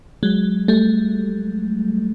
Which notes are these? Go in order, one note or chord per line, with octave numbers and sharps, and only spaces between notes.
F#3 G#3
G3 A3